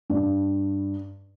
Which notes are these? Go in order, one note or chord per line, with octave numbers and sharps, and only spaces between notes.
G2